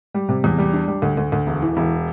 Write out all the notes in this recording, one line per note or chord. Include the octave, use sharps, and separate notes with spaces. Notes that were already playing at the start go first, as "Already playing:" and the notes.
G3
C3
E2
G3
D4
G3
D2
D2
D2
E1
E3
E1